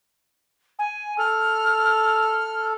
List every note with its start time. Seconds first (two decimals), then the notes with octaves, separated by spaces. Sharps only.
0.79 G#5
1.18 A4 F6